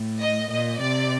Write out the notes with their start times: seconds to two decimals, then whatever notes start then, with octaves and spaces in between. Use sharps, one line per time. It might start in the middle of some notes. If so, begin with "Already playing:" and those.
Already playing: A2
0.20 D#5
0.50 A#2 D#5
0.80 C3 D5